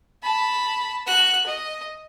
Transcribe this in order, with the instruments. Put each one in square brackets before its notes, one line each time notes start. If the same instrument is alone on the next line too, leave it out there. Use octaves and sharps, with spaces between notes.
[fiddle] A5 B5
F#4 F#6
D#5